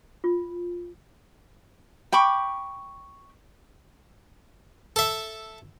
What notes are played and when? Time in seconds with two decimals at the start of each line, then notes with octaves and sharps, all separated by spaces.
0.24 F4
2.12 G5 B5 C#6 D6
4.96 A4 E5